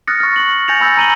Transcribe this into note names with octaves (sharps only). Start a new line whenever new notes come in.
D#6 F6 F#6 A6 A#6 C#7
C#6 F6
C#6 F#7
G#5 G6 A6 A#6 C#7 F7
G#5 B5 E6 G6
A#5 D#7 F#7 G7